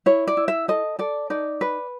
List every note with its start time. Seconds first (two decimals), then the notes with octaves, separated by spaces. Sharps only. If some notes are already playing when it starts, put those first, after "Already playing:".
0.06 E4 C#5
0.27 D5
0.37 E4
0.48 E5
0.68 A4 D#5
0.99 A4 D5
1.30 D#4 D5
1.61 B4